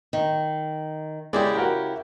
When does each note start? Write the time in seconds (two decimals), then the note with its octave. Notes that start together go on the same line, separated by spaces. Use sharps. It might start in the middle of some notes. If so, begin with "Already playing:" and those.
0.13 D#3
1.33 C#3 G#3 E4 G4 D5
1.55 F#4 A#4 G5